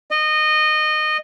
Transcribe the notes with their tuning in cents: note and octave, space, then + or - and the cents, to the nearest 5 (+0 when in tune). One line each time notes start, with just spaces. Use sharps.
D#5 -20